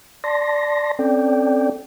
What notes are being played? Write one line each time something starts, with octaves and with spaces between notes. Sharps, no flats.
D5 A5 C6 A#6
C4 C#4 A4 D5 G5